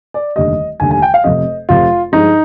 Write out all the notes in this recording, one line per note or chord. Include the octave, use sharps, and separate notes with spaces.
D5
F1 D#2 D3 G3 D#5
F1 D#2 D3 G3 G#5
G#5
G5
F5
F1 F2 C3 D#5
F1 F2 C3 F4
G2 F3 G#3 D#4